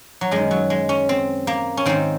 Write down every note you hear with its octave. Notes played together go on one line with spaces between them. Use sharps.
F#3
F#2 D#3 G#3
F#3
G#3
C#4
C4
A#3
C#4
G#2 D#3 C4